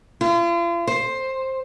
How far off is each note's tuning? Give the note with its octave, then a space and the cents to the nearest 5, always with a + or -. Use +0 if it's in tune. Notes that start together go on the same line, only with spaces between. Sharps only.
F4 -40
C5 +10